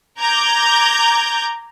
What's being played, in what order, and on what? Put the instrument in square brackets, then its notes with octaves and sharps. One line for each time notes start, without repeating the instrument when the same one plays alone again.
[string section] A#5 D6 G6 G#6